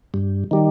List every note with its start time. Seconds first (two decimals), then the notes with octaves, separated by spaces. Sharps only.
0.14 G2
0.51 D#3 G3